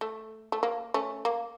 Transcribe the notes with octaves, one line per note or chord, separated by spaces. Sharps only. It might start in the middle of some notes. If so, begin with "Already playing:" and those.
A3
A3
A#3
A3 C#4
A#3